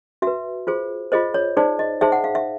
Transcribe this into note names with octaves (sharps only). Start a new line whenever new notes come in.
F#4 B4 E5
F4 G#4 C5
F4 G#4 C5 D#5
C#5
D#4 G#4 C5 D5
D#5
D#4 G#4 C5 E5
F#5
F5
E5